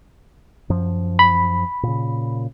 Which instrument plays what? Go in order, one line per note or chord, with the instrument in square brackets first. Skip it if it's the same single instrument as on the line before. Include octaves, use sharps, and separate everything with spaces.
[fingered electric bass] F#2 F3
[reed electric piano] B5
[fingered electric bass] A#2 C#3